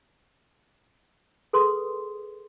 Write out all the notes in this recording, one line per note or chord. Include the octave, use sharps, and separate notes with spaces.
G#4 A4 B4 C6 D6 D#6